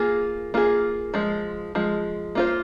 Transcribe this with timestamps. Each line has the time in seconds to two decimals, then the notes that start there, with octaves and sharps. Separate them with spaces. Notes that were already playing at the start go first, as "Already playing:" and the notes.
Already playing: A#3 F4 G#4
0.54 A#3 F4 G#4
1.14 F3 G#3
1.75 F3 G#3
2.35 A#3 F4 C5